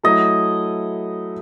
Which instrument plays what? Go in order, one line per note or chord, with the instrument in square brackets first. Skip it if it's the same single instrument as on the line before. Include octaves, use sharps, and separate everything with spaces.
[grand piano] F#3 A3 E4 A4 [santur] D#5